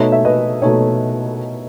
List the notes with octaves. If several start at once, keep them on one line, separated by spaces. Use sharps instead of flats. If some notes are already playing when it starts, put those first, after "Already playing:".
Already playing: B2 A3 D#4 C#5 E5
E5
B4 D#5
B2 A3 D#4 C#5